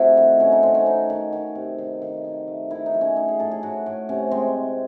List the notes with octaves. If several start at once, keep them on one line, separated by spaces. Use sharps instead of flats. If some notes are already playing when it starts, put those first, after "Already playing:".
Already playing: C3 A3 E4 F#4
D#3
A2 C#4
D#4
A2 C4
C#4
D#3 D#4
D#3
D#3
C3
D#3
D#3
D#3
A3
D#3 E4
D#4
F#3
C#4
A3 D#4
G#4
A2 A4
G#4
A2 F#4
A2
C3 C#4
G#3 C4